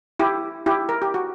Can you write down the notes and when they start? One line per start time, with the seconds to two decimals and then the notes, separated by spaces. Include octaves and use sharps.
0.19 E4 G4
0.66 E4 G4
0.89 A#4
1.02 G4
1.14 F#4